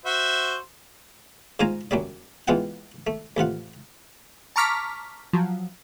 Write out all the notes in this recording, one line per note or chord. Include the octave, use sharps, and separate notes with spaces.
F#4 C5 E5
G#2 F4 C5 G#5 A#5
F#2 F#3 G3 D5
B2 E3 G#3 F4 F#5 G5
A3
A1 C3 F4 F#5
A5 A#5 C#6 D6 F6 B6
F3 F#3